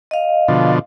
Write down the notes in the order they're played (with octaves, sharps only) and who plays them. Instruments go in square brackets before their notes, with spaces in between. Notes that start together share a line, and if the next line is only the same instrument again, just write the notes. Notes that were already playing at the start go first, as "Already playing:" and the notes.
[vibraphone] D#5 F5
[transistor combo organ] B2 D3 F3